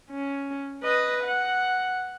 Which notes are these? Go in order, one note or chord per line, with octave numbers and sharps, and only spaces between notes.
C#4
B4 D#5
F#5